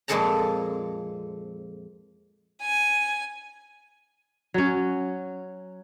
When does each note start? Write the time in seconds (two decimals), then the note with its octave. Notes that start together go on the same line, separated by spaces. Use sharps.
0.08 F2 A#2 G#3 A4 A5 A#5
2.62 G#5
4.54 F#3 C#4